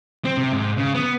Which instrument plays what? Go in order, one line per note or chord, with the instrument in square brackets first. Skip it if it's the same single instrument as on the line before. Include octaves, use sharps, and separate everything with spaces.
[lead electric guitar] C4
C3
G#2
C#3
B3